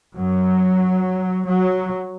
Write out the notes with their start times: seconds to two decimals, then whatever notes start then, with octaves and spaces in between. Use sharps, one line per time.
0.17 F#2 F#3
1.46 F#3